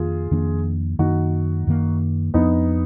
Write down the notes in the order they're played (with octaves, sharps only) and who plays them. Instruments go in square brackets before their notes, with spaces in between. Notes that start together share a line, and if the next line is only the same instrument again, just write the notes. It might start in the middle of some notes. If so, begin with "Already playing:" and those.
Already playing: [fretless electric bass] F2 D#3 A#3 D4 [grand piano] F4 G#4
[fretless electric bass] F2 D#3 A#3 D4
[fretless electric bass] F#2 D#3 A#3 [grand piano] D#4 F#4
[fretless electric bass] F#2 D#3 A#3
[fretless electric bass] F2 F3 A#3 D4 [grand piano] B3 D#4